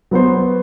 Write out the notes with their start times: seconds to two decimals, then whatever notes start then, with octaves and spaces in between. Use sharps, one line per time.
0.11 F#3 B3 F#4 C5